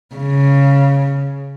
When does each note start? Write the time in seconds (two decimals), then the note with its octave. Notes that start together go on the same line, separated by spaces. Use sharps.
0.15 C#3